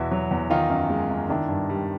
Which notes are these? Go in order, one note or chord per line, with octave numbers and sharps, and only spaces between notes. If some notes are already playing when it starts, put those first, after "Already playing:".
Already playing: E2 B2 E4 F#4
F#3
E2
D#3 D#4 F4
F#2
G#3
F#2
D#3 D4 E4
G2
G3